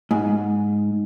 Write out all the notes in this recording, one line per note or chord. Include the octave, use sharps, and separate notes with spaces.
G#2